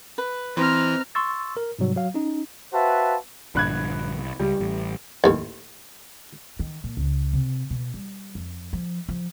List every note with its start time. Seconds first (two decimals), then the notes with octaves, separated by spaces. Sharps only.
0.18 B4
0.57 E3 C4 B4 C5 D#5 A#5 F6
1.15 C6 C#6 E6 A6
1.57 A#4
1.79 G#2 C3 F#3 G3
1.96 F#3 F5
2.14 C#4 D#4
2.73 F#4 B4 C5 E5 F5 A5
3.55 A#1 G2 D3 B5 F#6 G#6
4.18 C2
4.39 C#2 G3
4.60 A1
5.24 A1 D#2
6.59 D#3
6.84 A#2
6.97 C#2
7.33 C3
7.70 B2
7.94 G3
8.35 F2
8.73 F3
9.09 F3